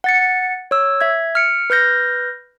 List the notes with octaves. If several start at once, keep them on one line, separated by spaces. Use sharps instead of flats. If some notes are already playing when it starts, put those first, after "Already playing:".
F#5 A6 C#7
C#5 E6
E5 G#6
F6 C#7 D7
B4 F6 G6 A#6